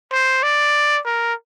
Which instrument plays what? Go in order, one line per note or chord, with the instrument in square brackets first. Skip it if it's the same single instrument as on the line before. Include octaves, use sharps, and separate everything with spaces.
[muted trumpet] C5
D5
A#4